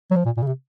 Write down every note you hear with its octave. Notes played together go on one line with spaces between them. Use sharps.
F#3
F3
A#2
A#2
C#3
C3